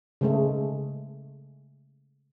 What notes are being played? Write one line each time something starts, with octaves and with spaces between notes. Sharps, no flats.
C#3 G#3 A3